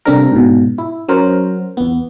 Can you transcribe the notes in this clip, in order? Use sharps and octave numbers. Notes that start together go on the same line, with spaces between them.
C3 G3 C4 D4 A4 A#4
G#2 B2
E4
F#3 C#4 F#4 A#4 C5
E2 B3